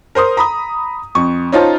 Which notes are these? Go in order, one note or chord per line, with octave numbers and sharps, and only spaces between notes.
A#4 C5 C6 D#6
A#5 B5 D#6
F2 C#6
C#4 D#4 F4 C5 A5